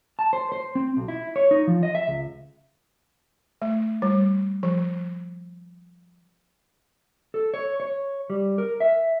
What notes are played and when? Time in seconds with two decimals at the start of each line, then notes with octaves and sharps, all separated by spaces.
0.19 A5
0.33 C5
0.52 C5
0.75 C4
0.97 B1
1.08 E4
1.36 C#5
1.51 D#4
1.67 F3
1.83 D#5
1.95 E5
2.08 C#2
3.62 A3
4.02 G3
4.63 F3
7.34 A4
7.54 C#5
7.80 C#5
8.30 G3
8.58 A#4
8.80 E5